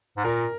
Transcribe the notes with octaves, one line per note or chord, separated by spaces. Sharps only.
G#2
A#2 A#4